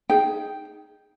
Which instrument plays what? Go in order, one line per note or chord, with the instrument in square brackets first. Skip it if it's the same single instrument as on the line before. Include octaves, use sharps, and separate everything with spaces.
[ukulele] D#4 G#4 G5